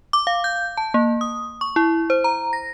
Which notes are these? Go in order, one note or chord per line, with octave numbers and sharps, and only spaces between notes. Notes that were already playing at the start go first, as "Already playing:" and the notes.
D6
F5
G6
A5
A#3
D#6
C#6
E4
C5
A#5
A#6